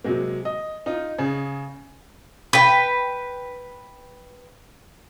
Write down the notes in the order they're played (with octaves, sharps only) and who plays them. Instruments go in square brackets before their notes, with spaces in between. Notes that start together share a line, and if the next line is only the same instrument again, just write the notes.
[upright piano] C3 F#3 G#3 A#3
D#5
D#4 F4
C#3 G#4
[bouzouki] B4 G5